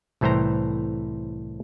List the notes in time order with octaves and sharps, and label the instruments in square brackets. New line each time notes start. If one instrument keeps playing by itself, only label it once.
[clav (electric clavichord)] C2 A2 E3 C5 G5 A#5